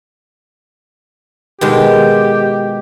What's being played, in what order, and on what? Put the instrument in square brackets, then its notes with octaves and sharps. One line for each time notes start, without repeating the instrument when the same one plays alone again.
[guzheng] B2 D#3 G#3 [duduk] G4